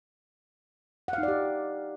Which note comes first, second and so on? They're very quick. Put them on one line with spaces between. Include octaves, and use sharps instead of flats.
F#5 F5 D#4 D5 G4